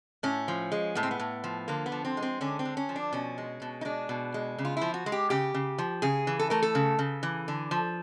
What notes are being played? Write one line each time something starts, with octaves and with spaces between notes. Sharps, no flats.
A2 C#4
F3
G#3
A2 B3
C4
B3
A2
F3
D3 A#3
B3
F3
C4
G#3
C4
D3 C#4
C4
D3
C#4
F3
D4
B2 C#4
G#3
B2
D#4
G#3 D4
B2
G#3
C#3
F4
F3 E4
F#4
G#3
G4
C#3 G4
C#3
F3
C#3 G#4
E3
A4
A3 A#4
A4
C#3
C#3
E3
D3
F3